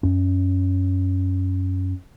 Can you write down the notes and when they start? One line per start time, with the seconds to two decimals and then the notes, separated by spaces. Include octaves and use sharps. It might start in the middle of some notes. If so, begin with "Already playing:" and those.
0.03 F#2 C#4